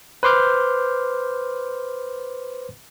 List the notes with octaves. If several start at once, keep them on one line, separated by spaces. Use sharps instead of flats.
B4 C5 C6 D6 F6 G6